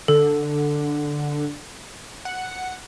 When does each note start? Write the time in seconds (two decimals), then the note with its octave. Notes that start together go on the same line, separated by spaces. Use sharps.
0.08 D3 A4
2.25 F#5